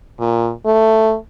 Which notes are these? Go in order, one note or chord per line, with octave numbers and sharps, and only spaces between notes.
A#2
A3